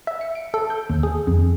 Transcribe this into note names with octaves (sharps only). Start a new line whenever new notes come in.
E5
C#7
D7
A4
G6
D#2
G#4
F2